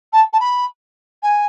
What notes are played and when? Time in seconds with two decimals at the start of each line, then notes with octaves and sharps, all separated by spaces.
0.13 A5
0.33 A5
0.40 B5
1.22 G#5